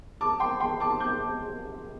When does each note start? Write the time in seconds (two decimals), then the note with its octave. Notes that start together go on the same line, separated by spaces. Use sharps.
0.21 A5 D6
0.40 G5 C6
0.60 G5 C6
0.80 A5 D6
1.00 D6 G6